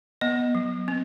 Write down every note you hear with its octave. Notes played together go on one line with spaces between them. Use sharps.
B3 D#5
F#3
C4